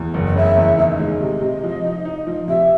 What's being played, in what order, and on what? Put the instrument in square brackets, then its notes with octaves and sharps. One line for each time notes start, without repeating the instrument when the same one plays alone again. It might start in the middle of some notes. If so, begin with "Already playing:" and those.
Already playing: [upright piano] E2
F#1
[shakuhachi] D#5
[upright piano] C#3 [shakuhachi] E5
[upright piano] E2
[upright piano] D#3 [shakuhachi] D#5 E5
[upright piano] G#3
C3
C3
F3
D#4
D#4
F3
[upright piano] C3 [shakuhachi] E5